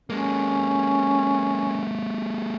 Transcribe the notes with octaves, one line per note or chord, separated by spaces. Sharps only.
G#3 A#3 C#4